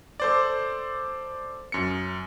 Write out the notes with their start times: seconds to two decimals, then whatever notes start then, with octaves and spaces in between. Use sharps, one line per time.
0.20 A4 C5 D5
1.72 F#2 C#7